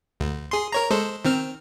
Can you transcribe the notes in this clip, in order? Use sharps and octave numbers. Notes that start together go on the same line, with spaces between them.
D2
G#4 C6
A#4 C#5 A#5
G#3 A4 C5
D#3 C4 F6